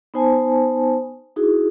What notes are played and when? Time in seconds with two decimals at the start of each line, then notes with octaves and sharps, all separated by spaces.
0.14 B3 D#4 C5 G#5 A5
1.36 D#4 E4 F#4 G#4